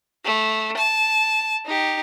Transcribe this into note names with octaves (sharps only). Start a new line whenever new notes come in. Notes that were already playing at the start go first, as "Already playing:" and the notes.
A3
A5
D#4 G4